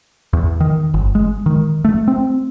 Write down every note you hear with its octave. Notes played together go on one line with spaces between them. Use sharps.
E2
D#3
G1
G#3
D#3
A3
C4